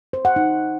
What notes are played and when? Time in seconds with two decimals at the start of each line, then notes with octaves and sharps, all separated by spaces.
0.13 C5
0.25 F#5
0.36 D#4